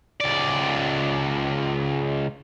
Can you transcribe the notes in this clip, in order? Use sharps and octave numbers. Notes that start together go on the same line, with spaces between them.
C#2 D5